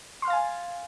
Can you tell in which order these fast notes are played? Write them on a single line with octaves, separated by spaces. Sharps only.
C6 F6 F5 A6 G#5